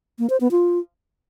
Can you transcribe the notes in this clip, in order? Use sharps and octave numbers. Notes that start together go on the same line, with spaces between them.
A#3
C5
B3
F4